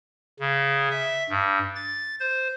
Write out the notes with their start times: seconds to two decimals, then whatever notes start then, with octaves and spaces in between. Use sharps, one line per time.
0.40 C#3
0.90 E5
1.30 G2
1.76 A6
2.20 C5